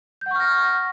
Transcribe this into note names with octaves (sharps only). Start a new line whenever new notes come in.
F#5 C#6 F6 G6 A#6